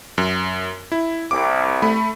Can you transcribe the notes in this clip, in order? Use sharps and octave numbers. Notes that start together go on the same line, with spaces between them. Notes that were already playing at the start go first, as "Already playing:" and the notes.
F#2
E4
C2 D6
A3 B5